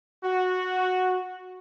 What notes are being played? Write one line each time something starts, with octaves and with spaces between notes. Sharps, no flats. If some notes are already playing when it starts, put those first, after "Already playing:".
F#4